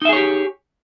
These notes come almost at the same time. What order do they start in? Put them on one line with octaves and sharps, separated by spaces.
D#4 E5 G#4 C#5 G4